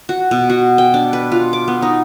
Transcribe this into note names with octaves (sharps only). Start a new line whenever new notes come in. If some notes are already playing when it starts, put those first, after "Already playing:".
F#4
B2
F#4
G5
D4
B4
F4
D6
B3
D#4